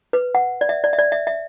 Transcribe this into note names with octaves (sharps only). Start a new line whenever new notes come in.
B4
F#5
D5
E5
D5
E5
D5
E5
E5